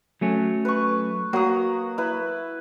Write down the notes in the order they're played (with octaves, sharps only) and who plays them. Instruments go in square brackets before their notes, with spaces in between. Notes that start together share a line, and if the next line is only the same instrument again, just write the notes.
[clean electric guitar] F#3 A3 C#4
[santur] B4 C#6
[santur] F#3 D#6 [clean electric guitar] A#3
[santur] E4 B4